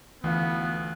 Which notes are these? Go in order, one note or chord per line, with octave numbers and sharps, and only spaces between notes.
D2 E3 B3 F4 F5